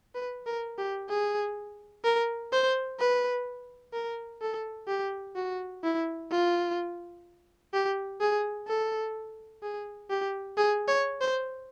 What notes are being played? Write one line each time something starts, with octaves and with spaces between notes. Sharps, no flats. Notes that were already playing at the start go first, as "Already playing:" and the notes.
B4
A#4
G4
G#4
A#4
C5
B4
A#4
A4
G4
F#4
E4
F4
G4
G#4
A4
G#4
G4
G#4
C#5
C5